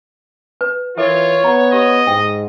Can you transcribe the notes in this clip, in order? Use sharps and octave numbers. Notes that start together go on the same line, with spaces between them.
B4
E3 F4 A4 A#4 C#5 E5
B3 A#5
G4 D#5
G#2 G5